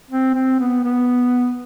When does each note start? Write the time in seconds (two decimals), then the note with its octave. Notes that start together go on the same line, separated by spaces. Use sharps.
0.11 C4
0.35 C4
0.59 B3
0.84 B3